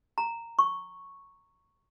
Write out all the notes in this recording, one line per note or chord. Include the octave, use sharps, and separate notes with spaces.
A#5
C#6